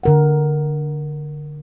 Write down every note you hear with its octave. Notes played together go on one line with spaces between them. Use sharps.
D3 A#4 F#5